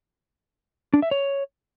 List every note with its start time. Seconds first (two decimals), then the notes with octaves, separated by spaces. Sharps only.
0.94 D4
1.02 E5
1.11 C#5